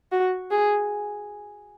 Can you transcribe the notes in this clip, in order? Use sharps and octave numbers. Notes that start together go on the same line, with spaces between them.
F#4
G#4